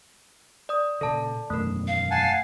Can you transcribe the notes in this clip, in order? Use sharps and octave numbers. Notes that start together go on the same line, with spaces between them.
D5 D#6
A#2 C#3 A4 D5 A5
E1 F#2 D#3 A3 A#4
F5
F#5 G#5 A5